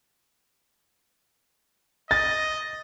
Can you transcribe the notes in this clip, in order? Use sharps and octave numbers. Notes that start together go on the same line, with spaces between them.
D#5 A6